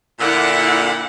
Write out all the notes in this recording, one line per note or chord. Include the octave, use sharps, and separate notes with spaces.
A#2 D3 E4 F#5